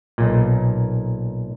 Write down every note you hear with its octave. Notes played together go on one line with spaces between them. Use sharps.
B1 A#2